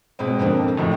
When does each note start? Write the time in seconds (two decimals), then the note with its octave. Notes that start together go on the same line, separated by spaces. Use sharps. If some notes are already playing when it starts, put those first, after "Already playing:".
0.19 B2 G#3 C4
0.39 F2 D3 A#3 C4
0.77 G#1 F2 A2